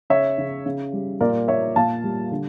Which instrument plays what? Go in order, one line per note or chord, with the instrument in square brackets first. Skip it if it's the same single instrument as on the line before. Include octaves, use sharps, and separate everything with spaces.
[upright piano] C#3 C#5 E5
C#3
C#3
G3
A#2 A#4 D5
A#2 C#5 E5
A#2 F5 A5
G3
D3